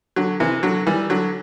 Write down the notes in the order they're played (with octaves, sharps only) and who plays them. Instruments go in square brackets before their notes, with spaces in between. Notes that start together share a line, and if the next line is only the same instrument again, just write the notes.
[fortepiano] D3 F#3
C3 E3
D3 F#3
E3 G3
D3 F#3